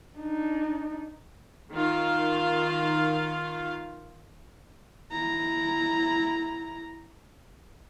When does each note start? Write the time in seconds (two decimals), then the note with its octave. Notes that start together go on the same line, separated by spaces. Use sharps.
0.18 D4 D#4
1.73 D#3 F4 F5
5.11 E4 A#5